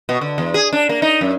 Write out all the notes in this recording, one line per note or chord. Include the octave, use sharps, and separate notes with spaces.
B2
D3
E2
G#4
D4
A#3
D#4
F#2